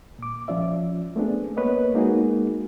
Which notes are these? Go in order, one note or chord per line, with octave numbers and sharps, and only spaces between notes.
A#2 D6
F3 C#4 F4 D5 E5
A3 B3 C4 D4 G#4
A#3 B3 B4 C#5 D#5
G#3 A#3 D#4 F#4 G#4